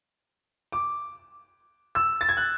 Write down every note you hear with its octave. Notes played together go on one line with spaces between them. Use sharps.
D6
E6
A6
G#6
F#6